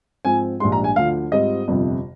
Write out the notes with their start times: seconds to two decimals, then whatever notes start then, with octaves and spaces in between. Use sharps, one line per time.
0.25 G#2 F3 C4 G#5
0.60 A#1 G#2 G3 D4 C6
0.72 A#5
0.84 G#5
0.96 D2 D3 F3 F5
1.32 G#2 G3 C4 F4 D#5
1.68 G1 F2 C3